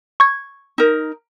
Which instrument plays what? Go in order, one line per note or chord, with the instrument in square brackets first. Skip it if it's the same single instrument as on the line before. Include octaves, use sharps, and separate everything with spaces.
[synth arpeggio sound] C#6 G#6
[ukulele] D#4 A#4